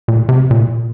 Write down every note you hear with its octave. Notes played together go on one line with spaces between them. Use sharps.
A#2
C3
A#2